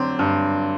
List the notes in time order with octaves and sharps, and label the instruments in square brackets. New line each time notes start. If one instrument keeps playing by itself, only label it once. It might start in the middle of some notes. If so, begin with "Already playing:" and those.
Already playing: [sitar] D3 F#3 [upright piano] C4
[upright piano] G2